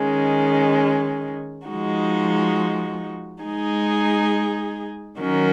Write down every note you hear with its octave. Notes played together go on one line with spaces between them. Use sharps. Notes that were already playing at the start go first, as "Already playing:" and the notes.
Already playing: D#3 G#3 C#4
F3 G#3 D#4 F#4
G#3 D#4 G#4
D#3 F#3 C#4 F#4 A#4